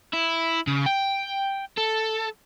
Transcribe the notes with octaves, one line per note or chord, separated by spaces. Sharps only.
E4
C#3
G5
A4